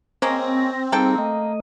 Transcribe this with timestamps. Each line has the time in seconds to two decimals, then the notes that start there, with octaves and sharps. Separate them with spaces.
0.22 G#3 A#3 C4 C#4 A#6
0.92 G3 A#3 D#4 G#4 A4 G5
1.18 A3 D#5